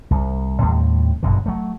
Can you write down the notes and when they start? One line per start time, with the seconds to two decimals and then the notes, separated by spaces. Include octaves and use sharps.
0.11 C2
0.61 D#2 A2 G3 C4
1.23 G1 F#2 B2 D3
1.46 F#3 A3